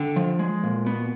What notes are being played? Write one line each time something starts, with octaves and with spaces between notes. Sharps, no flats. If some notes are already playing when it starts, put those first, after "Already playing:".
Already playing: D3 G5
F3
G#3
A#2
B3